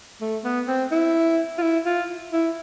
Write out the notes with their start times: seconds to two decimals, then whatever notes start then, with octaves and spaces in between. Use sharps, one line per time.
0.21 A3
0.44 B3
0.68 C4
0.91 E4
1.58 F4
1.62 E4
1.86 F4
2.33 E4